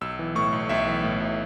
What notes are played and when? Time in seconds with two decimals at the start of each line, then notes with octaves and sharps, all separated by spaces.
0.01 B1 E6
0.19 E3
0.35 A2 C#6
0.52 B1
0.69 B1 E5
0.87 E3
1.03 A2
1.20 B1